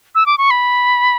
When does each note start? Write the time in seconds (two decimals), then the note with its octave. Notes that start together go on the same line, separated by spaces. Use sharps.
0.15 E6
0.26 D6
0.38 C#6
0.51 B5